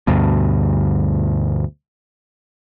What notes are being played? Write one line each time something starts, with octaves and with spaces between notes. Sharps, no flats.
D2 G2 B2